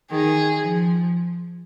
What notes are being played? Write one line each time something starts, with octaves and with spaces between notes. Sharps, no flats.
D#3 G#4
F3